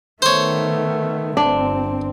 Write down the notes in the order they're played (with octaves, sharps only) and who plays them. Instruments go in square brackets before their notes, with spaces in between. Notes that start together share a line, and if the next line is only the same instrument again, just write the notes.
[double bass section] D#3 [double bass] A3 B3 [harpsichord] C5 C#5
[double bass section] G1 C4 [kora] D4